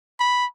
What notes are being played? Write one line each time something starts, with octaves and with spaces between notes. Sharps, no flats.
B5